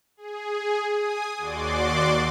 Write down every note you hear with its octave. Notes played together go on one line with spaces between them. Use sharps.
G#4
G#5 D#6
D#2 F#4 D5 C6 D6